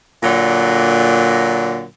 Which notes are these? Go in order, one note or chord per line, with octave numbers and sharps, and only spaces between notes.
A#2 D3 F#3